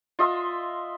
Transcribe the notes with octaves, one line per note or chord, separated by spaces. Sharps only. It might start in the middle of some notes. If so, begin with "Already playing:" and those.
F4 D#5 E5 C6